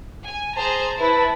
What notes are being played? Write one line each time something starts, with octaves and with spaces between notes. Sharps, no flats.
G#5
G#4 C5 A5 A#5
E4 B4